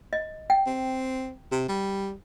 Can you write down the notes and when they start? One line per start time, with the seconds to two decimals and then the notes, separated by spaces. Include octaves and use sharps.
0.13 D#5
0.50 G5
0.67 C4
1.52 C3
1.69 G3